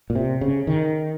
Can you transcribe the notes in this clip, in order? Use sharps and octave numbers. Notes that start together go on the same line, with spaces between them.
A#2
C3
C#3
D#3